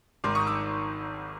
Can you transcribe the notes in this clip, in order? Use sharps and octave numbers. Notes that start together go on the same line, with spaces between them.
G#1 G#2 D#3 C6 D6
C#6 D#6
D6 E6